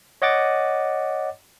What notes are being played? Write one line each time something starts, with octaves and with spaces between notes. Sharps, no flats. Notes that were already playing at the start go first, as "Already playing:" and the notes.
C#5 D#5 F#5 D6 A6